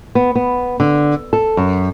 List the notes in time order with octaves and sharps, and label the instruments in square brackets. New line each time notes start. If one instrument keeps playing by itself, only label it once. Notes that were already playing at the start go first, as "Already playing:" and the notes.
[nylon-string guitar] B3
B3
D3
A4
F#2